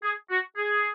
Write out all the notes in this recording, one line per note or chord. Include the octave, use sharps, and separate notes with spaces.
G#4
F#4
G#4